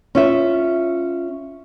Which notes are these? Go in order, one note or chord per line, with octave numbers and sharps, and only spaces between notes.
C#4 F4 E5